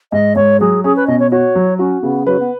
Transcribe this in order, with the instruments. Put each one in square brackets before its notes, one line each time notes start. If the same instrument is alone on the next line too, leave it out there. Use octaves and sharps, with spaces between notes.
[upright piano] G#2 [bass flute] D#5
[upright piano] G#2 [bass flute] C#5
[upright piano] F#3 [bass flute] G#4
[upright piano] C#4 [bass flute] G#4
[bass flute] B4
[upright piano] B2 [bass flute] D#5
[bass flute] C#5
[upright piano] F#4 [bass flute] C#5
[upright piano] F#3
[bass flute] C#4 [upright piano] F#4
[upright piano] C#3 [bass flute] B3
[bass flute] F#3 [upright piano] B4
[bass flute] B3